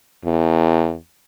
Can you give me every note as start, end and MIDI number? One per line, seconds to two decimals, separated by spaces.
0.25 0.95 40